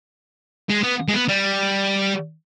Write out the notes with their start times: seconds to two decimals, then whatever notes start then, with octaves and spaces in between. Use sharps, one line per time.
0.69 G#3
0.83 B3
1.08 G#3
1.13 B3
1.29 G3